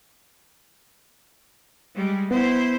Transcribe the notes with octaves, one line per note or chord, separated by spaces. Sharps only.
G3 G#3
B3 E4 C5